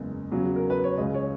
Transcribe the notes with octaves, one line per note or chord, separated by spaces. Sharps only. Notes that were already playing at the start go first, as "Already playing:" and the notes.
Already playing: F#1 E2 C#3 G#3
E2 C#3 F#3
A#4
B4
C#5
C#2 C#3 G#3 D#5
C#5